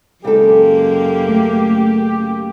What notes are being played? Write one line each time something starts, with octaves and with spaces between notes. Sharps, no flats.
F#2 C#3 G#3 A#3 G4 A4
A3